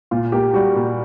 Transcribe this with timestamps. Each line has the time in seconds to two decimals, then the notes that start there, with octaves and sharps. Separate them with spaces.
0.11 A#2 F4
0.32 A#3 G4
0.54 G3 F#4
0.75 A#2